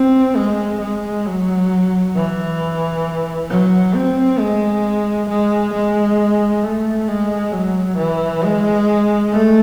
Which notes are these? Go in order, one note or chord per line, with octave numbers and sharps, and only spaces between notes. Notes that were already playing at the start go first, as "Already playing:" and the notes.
Already playing: C4
G#3
G#3
F#3
E3
F#3
C4
G#3
G#3
G#3
A3
G#3
F#3
E3
G#3
A3